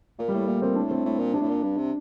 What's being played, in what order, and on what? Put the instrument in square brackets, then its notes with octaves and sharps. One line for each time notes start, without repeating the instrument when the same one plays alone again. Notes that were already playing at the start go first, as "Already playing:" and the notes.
[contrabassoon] A#2 [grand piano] A#3
[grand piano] G3
[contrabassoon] A2 [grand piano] A3
[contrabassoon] A#2 [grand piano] A#3
[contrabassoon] A#2 [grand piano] C4
[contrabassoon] A2 [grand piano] D4
[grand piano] C4
[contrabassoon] A2
A#2
[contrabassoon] C3 [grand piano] D4
[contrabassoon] A2
A#2
G2
C3